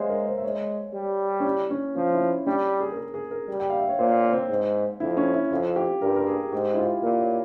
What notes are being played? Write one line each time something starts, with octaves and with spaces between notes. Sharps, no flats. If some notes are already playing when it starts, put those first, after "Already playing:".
Already playing: G#3 C5 C#5 E5 F5
A#4
C5
E5
G#3 C#5
G3
C#4
E4
C#4
F3 C#4
E4
C#4
G3 C#4
G#4
A#4
G#4
G#4
A#4
G3
G5
F5
E5
C#5
A#2 C5
C4
G#2
F2 E4
C#4
E4
F2 F4
G4
G2 A#4
A#4
G#4
G#2 G4
E4
F4
A#2 A#4
C#5